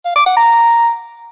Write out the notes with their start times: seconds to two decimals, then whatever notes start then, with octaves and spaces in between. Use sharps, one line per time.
0.05 F5
0.16 D6
0.26 F#5
0.37 A#5